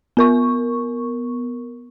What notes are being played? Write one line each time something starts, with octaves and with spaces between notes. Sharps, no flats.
B3 A#4 C#6